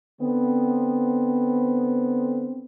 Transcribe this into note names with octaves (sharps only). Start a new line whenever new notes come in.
D3 B3 C4